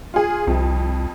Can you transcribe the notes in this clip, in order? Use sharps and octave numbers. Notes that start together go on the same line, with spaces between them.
F4 G#4
C2 F2